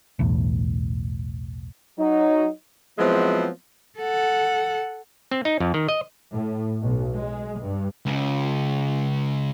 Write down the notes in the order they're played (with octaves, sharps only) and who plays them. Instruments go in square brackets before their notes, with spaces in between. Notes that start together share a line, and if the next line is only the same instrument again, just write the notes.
[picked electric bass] B1 E2 A2
[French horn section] F#3 D#4
[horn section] F3 F#3 G#3 B3 C4 E4
[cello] A4 F#5
[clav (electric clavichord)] C4
D#4
F2
D#3
D#5
[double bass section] A2
B1
G#3
G2
[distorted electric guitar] C#2 C#3